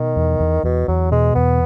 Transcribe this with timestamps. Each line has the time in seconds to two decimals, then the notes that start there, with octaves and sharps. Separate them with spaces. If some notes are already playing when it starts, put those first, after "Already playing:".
Already playing: B2 D#3
0.16 E2
0.40 E2
0.63 E2 B2
0.88 E2 F#3
1.12 B2 G#3
1.35 E2 B3